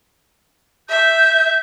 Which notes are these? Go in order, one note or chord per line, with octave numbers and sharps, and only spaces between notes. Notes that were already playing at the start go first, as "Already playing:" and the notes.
E5 G6